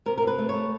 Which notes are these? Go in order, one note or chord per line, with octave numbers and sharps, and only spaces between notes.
C3 A#4
A#4
C3
B4
A3
A3 C#5